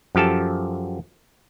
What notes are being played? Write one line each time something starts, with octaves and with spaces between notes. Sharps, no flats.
F#2 F3 G4 A4 A5